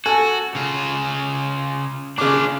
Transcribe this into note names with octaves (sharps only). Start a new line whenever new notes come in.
F#4 A4 G#5
C#3 F4
C#3 D4 F4 D6